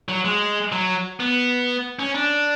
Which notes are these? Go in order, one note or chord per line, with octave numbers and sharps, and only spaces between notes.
F#3
G#3
F#3
B3
C#4
D4